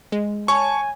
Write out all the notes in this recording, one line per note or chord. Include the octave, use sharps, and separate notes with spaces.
G#3
C#5 G#5 A5 C#6